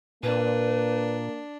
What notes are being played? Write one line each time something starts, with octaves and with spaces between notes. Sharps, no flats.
A#2 A#3 D4 B4